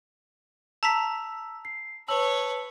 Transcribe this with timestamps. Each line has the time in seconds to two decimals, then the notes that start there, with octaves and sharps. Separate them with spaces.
0.83 A5 A#5 E6 B6
1.65 C7
2.08 B4 C#5 A5 E6 F#7